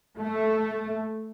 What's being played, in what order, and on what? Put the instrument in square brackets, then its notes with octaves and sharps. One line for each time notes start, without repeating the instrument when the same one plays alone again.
[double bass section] A3